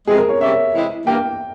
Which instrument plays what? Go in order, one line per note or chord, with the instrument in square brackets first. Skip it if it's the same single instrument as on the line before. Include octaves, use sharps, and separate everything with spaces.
[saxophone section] F2 C3 E3 G#3 [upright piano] G#4
[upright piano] A#4
C#5
[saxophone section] C3 G3 A#3 C#4 [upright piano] E5
[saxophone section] C3 E3 G#3 E4 G4
[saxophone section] G2 E3 A#3 [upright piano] G5